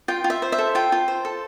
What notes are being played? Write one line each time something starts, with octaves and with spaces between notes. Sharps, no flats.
F4 G5
F4
E5
C5
E5
A4
F4 G5
F4
C5
A4